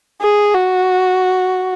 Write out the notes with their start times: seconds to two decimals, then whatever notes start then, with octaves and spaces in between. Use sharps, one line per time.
0.21 G#4
0.54 F#4